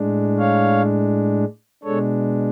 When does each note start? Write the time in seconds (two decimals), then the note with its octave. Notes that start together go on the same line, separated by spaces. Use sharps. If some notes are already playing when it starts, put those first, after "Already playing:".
Already playing: A2 G#3 D4
0.39 C#5 F5
1.83 B2 G#3 D4 A4 C#5